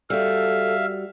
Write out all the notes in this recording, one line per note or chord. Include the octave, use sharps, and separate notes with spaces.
G3 F#4 A4 E5 F5